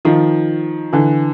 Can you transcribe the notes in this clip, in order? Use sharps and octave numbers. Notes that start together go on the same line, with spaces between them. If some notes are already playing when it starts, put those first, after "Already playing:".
D#3 F3
D3 E3